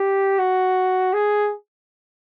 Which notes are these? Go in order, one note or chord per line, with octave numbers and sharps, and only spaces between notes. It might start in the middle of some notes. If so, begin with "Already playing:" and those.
Already playing: G4
F#4
G#4